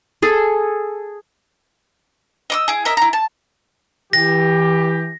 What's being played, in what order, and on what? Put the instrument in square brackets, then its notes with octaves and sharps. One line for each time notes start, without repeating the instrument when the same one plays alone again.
[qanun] G#4 A4
[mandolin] D#5 D6 E6
E4 G#4
A#4 D#5 E5
E4 A#5
A5
[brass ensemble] E3 G4 [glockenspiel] A#6